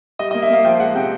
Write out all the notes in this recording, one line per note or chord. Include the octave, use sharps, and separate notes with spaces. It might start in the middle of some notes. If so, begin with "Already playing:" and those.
G3 D#5
D#5
A#3
E5
A#3 F5
F3 G5
G#3 F#5
C3 G5